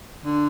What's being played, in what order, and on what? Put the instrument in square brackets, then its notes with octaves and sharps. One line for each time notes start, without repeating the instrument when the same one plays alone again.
[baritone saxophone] D3